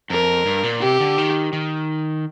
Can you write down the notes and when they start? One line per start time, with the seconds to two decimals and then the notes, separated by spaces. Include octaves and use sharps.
0.10 F2 A#4
0.46 G2
0.63 A#2
0.81 C3 G4
1.00 D3
1.18 D#3
1.53 D#3